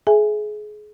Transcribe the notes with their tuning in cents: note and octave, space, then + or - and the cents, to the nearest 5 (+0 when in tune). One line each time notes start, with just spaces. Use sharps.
G#4 +25 E5 +0 G#5 +0